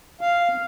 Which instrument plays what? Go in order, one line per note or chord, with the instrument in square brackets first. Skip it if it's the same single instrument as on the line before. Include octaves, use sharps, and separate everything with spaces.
[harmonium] F5